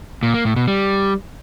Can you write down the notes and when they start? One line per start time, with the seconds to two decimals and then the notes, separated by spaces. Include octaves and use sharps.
0.23 A#2
0.34 A#3
0.45 A2
0.56 B2
0.68 G3